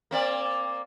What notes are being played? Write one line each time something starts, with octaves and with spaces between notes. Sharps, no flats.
A#3 C4 D5